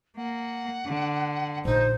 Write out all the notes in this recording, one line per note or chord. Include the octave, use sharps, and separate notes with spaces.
A#3 F#5
D3
A#1 D#4 C5